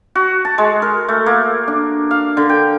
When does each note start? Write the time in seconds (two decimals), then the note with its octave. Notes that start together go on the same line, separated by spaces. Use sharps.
0.15 F#4
0.45 A5
0.58 G#3
0.82 A#4
1.08 A3
1.26 A#3
1.68 D4
2.11 F5
2.37 D3
2.49 G5